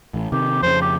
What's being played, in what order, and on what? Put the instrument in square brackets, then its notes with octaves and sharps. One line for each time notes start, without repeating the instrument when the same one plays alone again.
[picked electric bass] A1
[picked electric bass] C3 D#3 [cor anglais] G4
[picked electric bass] F2 C#3 [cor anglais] C5
[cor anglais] G4